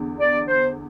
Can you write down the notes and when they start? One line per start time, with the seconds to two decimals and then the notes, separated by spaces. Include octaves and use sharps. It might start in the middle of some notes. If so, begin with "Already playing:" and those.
Already playing: E2 D3
0.20 D5
0.48 C5